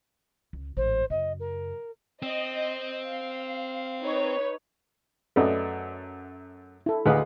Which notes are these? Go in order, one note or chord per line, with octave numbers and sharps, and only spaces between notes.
C#2
A1 G#2 C5
F#2 C#3 D#5
A#4
C4 D#5
F5
D#4 B4 C#5
F#2 A3 B4 D5 D#5
E4 A4
D2 G#4 B4 D#5 F5